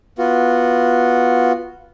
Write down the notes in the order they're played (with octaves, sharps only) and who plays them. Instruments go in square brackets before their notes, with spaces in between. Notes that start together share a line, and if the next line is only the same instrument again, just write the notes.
[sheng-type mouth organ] B3 F4 F#4